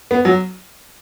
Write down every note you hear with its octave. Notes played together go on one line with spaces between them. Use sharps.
B3
F#3